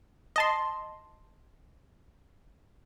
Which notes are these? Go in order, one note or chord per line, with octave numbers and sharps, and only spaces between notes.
D#5 A5 C6